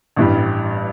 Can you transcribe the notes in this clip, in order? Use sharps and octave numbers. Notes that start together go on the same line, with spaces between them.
A1 G2 G3